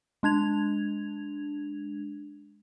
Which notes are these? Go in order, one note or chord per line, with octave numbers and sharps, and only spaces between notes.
G#3 D4 G#6 F7